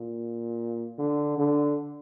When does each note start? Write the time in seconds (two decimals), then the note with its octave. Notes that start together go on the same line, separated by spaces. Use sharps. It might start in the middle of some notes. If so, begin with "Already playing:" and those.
Already playing: A#2
0.98 D3
1.38 D3